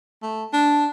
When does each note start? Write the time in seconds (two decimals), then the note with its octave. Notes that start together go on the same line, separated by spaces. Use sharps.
0.23 A3
0.53 D4